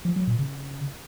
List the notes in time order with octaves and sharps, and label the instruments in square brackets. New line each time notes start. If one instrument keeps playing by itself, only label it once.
[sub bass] F3
F#3
A#2
C#3